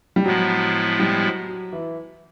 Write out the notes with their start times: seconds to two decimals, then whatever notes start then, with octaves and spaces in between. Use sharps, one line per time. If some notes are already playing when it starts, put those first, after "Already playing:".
0.16 G3
0.24 A2 F3 F#3 G#3 B3 E4
1.00 G3
1.23 F#3
1.48 F#3
1.73 E3